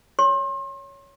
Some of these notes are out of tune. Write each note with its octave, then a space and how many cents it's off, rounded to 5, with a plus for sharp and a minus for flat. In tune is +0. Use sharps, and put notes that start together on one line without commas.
C#5 +10 C6 +40